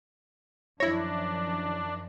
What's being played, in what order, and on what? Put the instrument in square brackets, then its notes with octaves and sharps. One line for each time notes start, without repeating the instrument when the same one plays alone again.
[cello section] F#2 D#3 F3 [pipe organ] D4 [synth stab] E4 C#5 [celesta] A#6